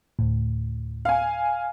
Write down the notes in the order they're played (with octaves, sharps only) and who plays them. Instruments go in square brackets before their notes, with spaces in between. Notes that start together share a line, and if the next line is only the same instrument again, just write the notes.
[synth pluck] D2 A2
[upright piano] F5 G#5